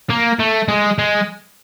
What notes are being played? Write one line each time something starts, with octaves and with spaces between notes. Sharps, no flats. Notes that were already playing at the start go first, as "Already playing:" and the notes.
A#3
A3
G#3
G#3